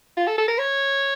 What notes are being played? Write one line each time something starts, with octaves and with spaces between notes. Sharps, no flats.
F4
A4
A4
A#4
C#5